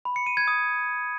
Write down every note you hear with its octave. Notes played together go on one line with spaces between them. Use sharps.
B5
C#7
D#7
G#6
D#6